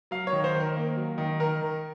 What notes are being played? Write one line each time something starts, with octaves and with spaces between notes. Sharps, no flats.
F#3 F5
C#5
D#3
C5
D#3
A#4
A#3
F#3
D#3
D#3 A#4
D#3